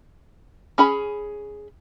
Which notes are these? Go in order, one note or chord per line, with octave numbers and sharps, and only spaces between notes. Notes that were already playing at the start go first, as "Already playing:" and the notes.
C#4 G#4 B5